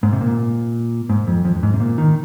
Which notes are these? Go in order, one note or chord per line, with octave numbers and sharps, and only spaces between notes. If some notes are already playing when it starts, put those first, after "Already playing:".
G#2
C3
A#2
G#2
F2
F2
F2
G#2
C3
A#2
D#3